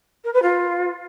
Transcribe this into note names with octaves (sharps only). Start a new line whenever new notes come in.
A#4
B4
F4